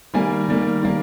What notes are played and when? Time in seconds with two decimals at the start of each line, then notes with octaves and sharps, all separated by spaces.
0.14 D#3 G3 A#3 G#5
0.48 D#3 G3 A#3
0.83 D#3 G3 A#3